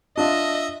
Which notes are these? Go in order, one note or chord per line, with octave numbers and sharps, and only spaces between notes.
D4 F4 D#5 E5